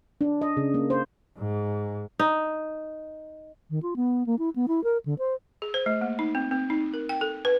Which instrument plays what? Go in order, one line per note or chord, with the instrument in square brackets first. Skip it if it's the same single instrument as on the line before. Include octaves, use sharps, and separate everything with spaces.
[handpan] D4
D#5
C#3
A#3
C5
[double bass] G#2
[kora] D#4
[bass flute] D#3
F4
B3
A#3
E4
B3
E4
A#4
D3
C5
[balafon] G#4
C5
A3
A#3
D#4
C4
C4
D#4
A#4
G5
A4
B4